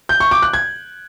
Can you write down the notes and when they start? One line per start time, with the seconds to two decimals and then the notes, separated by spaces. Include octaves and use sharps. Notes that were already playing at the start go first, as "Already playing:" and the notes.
0.09 G6
0.20 C#6
0.31 D6
0.42 F#6
0.53 G#6